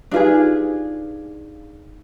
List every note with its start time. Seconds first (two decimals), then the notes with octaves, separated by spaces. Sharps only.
0.12 D4 D#4 F4 G4 G#4 B4